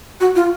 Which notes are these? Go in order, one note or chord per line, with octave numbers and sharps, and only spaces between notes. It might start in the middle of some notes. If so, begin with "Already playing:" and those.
F#4
F4